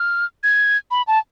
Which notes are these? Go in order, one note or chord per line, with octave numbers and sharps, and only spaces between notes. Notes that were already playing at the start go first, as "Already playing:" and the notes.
Already playing: F6
G#6
B5
A5